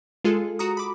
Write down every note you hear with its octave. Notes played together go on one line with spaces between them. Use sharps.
G#3 F4 G#4 A4
F#4 A#5 D#6
B5 D6